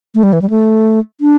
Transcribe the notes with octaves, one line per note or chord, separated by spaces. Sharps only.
A3
G3
E3
G3
A3
D4